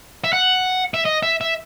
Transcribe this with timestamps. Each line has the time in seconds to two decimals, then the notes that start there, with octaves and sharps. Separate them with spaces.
0.24 E5
0.33 F#5
0.94 E5
1.05 D#5
1.23 E5
1.41 E5